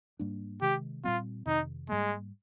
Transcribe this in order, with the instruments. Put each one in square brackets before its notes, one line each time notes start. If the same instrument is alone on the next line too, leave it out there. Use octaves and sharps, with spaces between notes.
[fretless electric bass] G#2 G3 A#3 D4
[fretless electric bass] C3 D#3 G#3 [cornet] G4
[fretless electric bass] A#2 G3 C4 [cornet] F4
[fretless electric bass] F2 C3 D#3 [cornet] D#4
[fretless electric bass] G#2 G3 A#3 [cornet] G#3